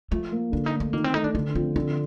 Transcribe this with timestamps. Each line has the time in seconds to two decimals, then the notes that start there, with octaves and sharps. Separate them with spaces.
0.11 F3 A3
0.32 A#3
0.52 D3 D4
0.66 D#4
0.73 A3
0.80 D4
0.93 D#3 A#3
1.04 C4
1.14 A3 D#4
1.24 D4
1.35 D3 D4
1.55 F3 C4
1.76 D3 C4